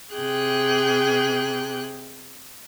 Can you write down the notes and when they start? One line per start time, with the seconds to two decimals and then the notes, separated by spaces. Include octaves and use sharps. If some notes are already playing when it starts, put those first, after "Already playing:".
0.15 C3 G#4 G5 F#6